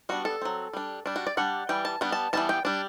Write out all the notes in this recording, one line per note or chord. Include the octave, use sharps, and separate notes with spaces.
G3 B3 D4 F#4
A4
F#3 C4
G3 D4
G3 D4
F#4
D5
G3 D4 F#5
E3 G3 G5
A5
G3 B3 D4
A5
E3 G3 B3 A5
G5
G3 D4